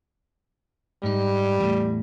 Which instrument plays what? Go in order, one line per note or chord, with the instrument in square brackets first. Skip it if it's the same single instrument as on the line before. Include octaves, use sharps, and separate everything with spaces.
[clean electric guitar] G#2 D#4 [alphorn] G3
[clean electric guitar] E2 A2